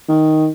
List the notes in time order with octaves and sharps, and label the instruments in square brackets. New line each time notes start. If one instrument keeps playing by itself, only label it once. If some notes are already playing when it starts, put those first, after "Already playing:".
[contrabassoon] D#3